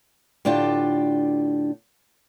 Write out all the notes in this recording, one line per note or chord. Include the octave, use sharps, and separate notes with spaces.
A2 D3 D4 F4 G4